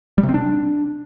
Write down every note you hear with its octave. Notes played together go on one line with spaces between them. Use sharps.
G3
C3
C4
D4